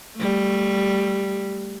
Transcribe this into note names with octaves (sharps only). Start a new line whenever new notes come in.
G3 A3